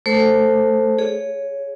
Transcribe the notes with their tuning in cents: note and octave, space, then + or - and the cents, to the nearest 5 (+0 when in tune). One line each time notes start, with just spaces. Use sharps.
A3 +0 A4 +20 C5 +5
G#4 +0 C#5 +5